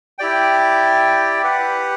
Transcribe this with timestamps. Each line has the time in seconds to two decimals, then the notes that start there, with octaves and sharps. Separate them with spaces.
0.18 E4 G4 D5 G5
1.43 G4 B4 F#5